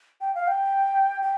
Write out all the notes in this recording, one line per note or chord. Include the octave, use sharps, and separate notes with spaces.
G5
F5
G5
G5